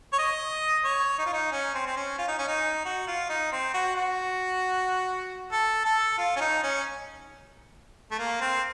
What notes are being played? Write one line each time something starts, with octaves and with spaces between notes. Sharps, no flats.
C#5
D#5
C#5
D#4
F4
D#4
C#4
C4
C4
C#4
F4
D#4
C#4
D#4
F#4
F4
D#4
C4
F#4
F#4
A4
A4
F4
C#4
D#4
C#4
A3
A#3
C4